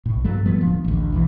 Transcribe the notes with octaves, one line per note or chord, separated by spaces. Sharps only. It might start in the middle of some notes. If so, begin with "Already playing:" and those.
B1 A2
G2 F#3 A3
F3 G3 A3 B3
D1 D2 F3
A1 D2
B1 E2 E3